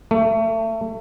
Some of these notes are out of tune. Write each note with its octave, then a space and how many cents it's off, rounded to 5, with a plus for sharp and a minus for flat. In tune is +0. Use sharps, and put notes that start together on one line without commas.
A3 +30